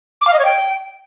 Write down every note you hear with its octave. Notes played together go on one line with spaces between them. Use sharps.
D6
F5
D#5
C#5
G5